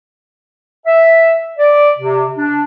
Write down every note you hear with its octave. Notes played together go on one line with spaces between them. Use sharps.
E5
D5
C3
D4